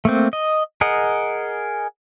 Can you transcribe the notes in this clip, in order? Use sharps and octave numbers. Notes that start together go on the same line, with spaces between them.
A3 A#3 C4
D#5
G#4 A#4 D#5 F#5